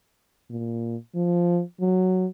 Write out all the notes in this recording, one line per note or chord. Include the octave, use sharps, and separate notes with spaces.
A#2
F3
F#3